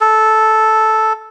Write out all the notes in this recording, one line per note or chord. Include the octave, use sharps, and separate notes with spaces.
A4